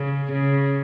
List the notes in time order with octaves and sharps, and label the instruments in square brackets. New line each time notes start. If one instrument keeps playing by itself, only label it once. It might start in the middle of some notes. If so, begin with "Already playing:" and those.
Already playing: [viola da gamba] C#3
C#3